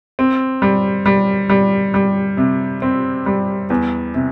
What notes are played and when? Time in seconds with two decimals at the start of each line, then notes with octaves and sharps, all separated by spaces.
0.19 C4
0.62 G3
1.06 G3
1.49 G3
1.94 G3
2.37 C3
2.82 C4
3.26 G3
3.70 E2
4.14 C3